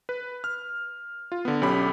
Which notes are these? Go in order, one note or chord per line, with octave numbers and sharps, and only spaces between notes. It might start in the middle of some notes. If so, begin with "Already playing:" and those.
B4
F6
F4
D3 B3
B1 C#4 G4 A4 B5